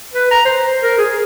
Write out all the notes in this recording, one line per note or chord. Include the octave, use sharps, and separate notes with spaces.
B4
A#5
C5
A#4
G#4